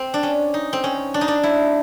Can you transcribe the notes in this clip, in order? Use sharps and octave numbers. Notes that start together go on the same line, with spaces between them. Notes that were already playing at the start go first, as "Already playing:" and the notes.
Already playing: C4
D4
C#4
D#4
C4
C#4
D4
D#4
D4
E4